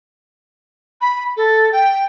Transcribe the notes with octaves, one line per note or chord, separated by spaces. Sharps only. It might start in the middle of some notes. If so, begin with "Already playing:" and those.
B5
A4
G5